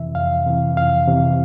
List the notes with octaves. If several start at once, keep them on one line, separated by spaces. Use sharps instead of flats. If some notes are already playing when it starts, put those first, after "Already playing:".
Already playing: F2 C3 E3 E5
F2 F5
C3 E3
F2 F5
C3 E3